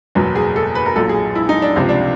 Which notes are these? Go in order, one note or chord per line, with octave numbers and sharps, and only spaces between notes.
F#1 E2 B2 F#3
G#4
A4
B4
A#4
B1 A#2 F#3 A4
G#4
E4
D#4
D4
C#2 C3 F3
D4